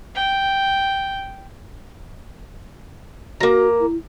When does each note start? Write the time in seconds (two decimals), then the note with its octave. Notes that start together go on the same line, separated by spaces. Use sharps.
0.16 G5
3.40 A#3 F#4 A#5
3.80 E4